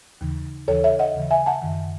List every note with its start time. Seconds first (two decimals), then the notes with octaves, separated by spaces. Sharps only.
0.21 D#2 C#3 E3
0.68 D#2 C#3 E3 A4 C#5
0.84 C#5 E5
0.99 D#5 F#5
1.15 D#2 C#3 E3
1.31 E5 G#5
1.46 F#5 A5
1.62 F#2 D#3